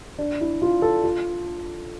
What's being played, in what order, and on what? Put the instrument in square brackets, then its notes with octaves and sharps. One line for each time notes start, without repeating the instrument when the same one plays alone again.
[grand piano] D4
E4
F4
A4
F4